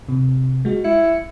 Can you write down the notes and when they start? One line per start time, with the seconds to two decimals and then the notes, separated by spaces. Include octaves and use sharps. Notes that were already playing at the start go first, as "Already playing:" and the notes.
0.09 C3
0.65 G#3 F#4
0.84 E4 C#7